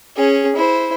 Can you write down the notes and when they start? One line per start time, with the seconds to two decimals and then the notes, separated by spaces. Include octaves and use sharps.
0.16 C#4 G#4
0.56 E4 C5